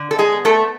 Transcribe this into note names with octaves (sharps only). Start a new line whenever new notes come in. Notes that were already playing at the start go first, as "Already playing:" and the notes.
Already playing: D3
A4
G#3 G#4
B3
A3 A4